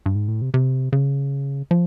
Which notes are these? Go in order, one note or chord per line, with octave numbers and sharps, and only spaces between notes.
G2
G#2
A2
C3
C3
C#3
F3